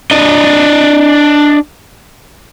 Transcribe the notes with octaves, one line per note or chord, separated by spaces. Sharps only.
D4 D#5